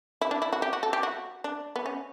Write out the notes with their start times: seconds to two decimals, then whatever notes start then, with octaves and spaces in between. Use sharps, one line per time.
0.21 E4
0.31 D4
0.42 E4
0.53 F#4
0.62 G4
0.73 F#4
0.83 A4
0.93 G4
1.03 F#4
1.44 D4
1.76 B3
1.86 C#4